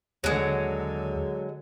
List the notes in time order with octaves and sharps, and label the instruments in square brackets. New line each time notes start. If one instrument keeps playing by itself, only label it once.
[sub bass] D#2 [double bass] D3 [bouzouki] F#3 G#3